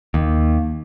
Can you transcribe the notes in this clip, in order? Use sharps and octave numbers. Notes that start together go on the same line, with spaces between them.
D#2